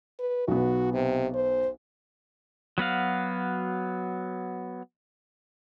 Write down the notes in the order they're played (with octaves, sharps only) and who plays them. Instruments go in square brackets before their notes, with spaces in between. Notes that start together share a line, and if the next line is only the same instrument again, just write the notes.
[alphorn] B4
[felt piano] B1 B3 [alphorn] F#4
[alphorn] C3
C5
[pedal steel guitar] F#3 B3 F#4 F5